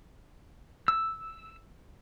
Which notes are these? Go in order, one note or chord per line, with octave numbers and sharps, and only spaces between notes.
E6